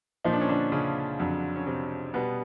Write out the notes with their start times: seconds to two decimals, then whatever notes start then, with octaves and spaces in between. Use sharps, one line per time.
0.24 A#2 F3 D#4
0.33 D4
0.41 C#4
0.49 D3 D4
0.72 C#3 C#4
1.19 F2 D3 F#3
1.56 C#4
1.67 C3 C4
2.14 B2 G3 B3